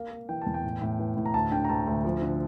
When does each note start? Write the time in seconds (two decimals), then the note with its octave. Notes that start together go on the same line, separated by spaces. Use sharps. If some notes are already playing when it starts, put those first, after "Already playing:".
Already playing: A#3 F5
0.11 A#3
0.29 E3 G5
0.42 E2 A5
0.54 G5
0.63 A2
0.82 A2
0.99 E3
1.17 A2
1.26 A#5
1.34 D2 A5
1.52 D3 G5
1.64 A#5
1.69 D2 A5
1.87 D2
2.04 F3
2.22 D3